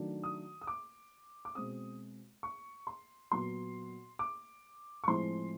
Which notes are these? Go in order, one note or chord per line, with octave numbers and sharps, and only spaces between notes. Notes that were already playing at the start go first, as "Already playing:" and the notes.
Already playing: D#3 F#3 A3 D4
D#6
D#6
D6
D6
B2 G#3 C4 D#6
C#6
C6
A#2 F#3 B3 C6
D6
C#6
A2 F3 G#3 C4 E4 C6